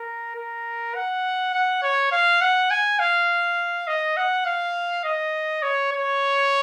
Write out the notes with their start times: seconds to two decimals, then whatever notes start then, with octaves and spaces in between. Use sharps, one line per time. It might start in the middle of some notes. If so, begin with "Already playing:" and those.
Already playing: A#4
0.36 A#4
0.95 F#5
1.54 F#5
1.82 C#5
2.12 F5
2.41 F#5
2.71 G#5
2.99 F5
3.87 D#5
4.17 F#5
4.46 F5
5.04 D#5
5.62 C#5
5.92 C#5